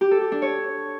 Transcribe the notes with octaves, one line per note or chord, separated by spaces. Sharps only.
G4
A4
G4
D4
C#5